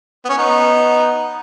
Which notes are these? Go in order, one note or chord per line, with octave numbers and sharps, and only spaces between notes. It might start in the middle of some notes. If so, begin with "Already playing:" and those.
B3
C#4
B3 D#4